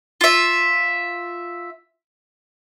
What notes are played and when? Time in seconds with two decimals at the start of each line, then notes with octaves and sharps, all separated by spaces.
0.21 F4 E5